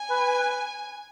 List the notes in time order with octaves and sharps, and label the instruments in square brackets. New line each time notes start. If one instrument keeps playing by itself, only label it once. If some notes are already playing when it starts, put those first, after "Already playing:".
Already playing: [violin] G#5
[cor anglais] B4